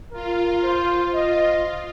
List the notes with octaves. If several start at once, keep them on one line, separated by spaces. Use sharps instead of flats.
F4 A#4
C5
F4 D#5